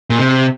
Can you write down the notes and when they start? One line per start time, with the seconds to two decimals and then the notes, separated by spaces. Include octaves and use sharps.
0.10 A#2
0.19 C3